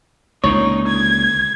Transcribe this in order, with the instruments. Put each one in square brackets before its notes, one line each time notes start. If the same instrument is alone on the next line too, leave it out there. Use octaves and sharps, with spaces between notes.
[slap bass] C#2 A#2 D3 [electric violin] D#4 [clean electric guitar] C#5
[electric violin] G#6